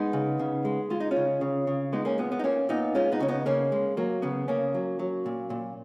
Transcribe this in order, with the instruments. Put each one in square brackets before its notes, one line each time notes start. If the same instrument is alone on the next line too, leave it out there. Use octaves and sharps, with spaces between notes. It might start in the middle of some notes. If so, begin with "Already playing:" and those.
Already playing: [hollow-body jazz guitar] G#3 B3 D#4
C#3
C#3
G#3
G#3 F4
D#4
C#4 F4
C#3
C#3
C#3
G#3 B3 D#4
A#3 C#4
A#2 B3
B3
D#4
A#2 A#3 C#4
A#2 B3 D#4
G#3 C#4 F4
B3 D#4
C#3 C#4
B3 D#4
C#3 A#3 C#4
G#3
F#3 A#3
C#3 B3
C#3 A#3 C#4
F#3
F#3
A#2
A#2